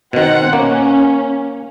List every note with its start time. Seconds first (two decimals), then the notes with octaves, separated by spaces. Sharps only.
0.13 B2 D#3 C4 F#5
0.53 A#3 C#4